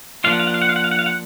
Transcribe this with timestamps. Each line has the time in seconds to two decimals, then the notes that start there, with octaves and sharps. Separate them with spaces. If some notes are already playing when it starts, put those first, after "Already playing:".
0.24 F3 A#3 D4 F4 F5
0.32 F#5
0.40 F5
0.47 F#5
0.54 F5
0.62 F#5
0.69 F5
0.76 F#5
0.84 F5
0.91 F#5
0.99 F5
1.06 F#5